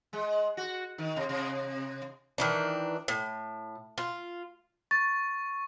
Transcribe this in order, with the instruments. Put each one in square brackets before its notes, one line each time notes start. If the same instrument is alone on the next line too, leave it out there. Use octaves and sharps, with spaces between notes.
[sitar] G#3
F#4
D#3
C3
C3
[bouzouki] D#3 E3 D4
A2
F4
[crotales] C#6 [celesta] A6